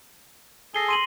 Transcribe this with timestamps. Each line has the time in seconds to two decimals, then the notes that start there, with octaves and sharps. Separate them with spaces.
0.75 G#4 A4 G#5 A#6 C7 G7
0.88 C6 D#7 F#7